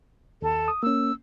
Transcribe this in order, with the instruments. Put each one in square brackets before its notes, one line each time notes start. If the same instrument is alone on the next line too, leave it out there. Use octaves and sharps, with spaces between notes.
[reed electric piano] D#2 [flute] A4
[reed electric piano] D#6
[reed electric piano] A#3 C#4 [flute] E6